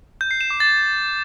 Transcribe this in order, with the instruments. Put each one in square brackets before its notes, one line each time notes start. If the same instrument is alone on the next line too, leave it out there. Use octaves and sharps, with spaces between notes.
[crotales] G6
C7
E7
D6
A6